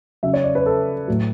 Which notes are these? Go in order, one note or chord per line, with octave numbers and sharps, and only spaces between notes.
C#3 F#3 E5
C#5
D5
B4
A4
A2 F#3